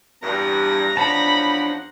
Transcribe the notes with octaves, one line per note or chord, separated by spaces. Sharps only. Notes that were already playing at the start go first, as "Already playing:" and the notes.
E2 G2 A#5
E2 F3 D4 C#5 F#5 A5 B5